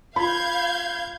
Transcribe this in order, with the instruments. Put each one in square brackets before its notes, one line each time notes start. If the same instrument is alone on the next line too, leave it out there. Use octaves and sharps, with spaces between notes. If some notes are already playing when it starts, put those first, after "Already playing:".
[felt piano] F4 B5 [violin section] F5 G6 G#6